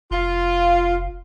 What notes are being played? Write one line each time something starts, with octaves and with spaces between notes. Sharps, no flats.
F1 F4